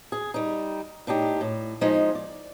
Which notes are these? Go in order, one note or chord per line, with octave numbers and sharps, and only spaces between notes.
G#4
G3 D#4
A2 D4 D#4 G4
A2
F3 G#3 D#4
D5